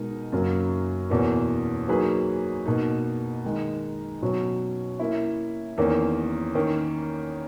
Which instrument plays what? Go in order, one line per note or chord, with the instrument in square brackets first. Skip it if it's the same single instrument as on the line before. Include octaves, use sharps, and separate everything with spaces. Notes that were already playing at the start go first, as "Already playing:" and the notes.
Already playing: [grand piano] B2 G#3 D#4 A#4
F#2 C#3 F#3 A#3
E2 B2 A#3 C#4
F#3 A#3 D#4 G#4 B4
B2 A#3 D#4
D#3 G#3 D#4
B2 F#3 C#4
A#3 C#4 E4
E2 D#3 A#3 C#4
D#3 A#3 C#4